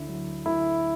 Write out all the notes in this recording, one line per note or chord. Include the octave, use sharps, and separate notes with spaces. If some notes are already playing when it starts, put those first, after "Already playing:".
Already playing: D2 D3 E4
F#3
D2 E4